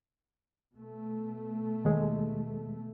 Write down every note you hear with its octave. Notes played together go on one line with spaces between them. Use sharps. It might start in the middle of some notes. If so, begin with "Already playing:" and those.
B2 A3
D#2 G#3